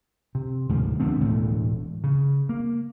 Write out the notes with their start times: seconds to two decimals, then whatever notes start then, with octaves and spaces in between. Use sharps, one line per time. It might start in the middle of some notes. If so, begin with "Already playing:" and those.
0.35 C3
0.69 D2 G#2 B2 F3
1.00 D3 F3 B3 C4
1.21 E1 D2 A2 A3
2.04 C#3
2.49 A#3